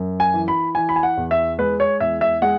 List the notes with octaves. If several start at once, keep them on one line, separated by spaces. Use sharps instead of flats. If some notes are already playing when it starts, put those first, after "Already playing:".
Already playing: F#2
G#5
E3
B5
E3 G#5
B5
G#5
F#5
E2
E5
G#3 B4
C#5
E2 E5
E5
G#3 F#5